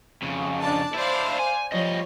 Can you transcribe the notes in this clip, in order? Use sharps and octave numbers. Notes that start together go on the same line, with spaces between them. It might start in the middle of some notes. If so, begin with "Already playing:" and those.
F2 C#3
D4 D5 A5
D4 E4 C5 D5 F5
G#5
F3 G3 C#5 D#5